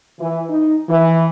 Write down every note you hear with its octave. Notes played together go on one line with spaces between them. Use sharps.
E3
D#4
E3